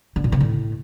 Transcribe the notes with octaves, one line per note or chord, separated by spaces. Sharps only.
D3
A#2
C#3
A2